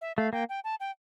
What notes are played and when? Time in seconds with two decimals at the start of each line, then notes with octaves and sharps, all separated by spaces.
0.01 E5
0.17 A3 F5
0.33 A#3 G5
0.49 G5
0.64 A5
0.80 G5